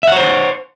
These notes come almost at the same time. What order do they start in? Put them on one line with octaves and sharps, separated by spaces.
E5 F#5 C#5 C5